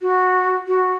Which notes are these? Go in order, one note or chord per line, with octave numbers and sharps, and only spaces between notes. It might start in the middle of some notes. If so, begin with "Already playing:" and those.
F#4
F#4